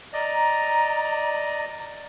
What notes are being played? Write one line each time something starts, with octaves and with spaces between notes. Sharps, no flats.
D5 D#5 A#5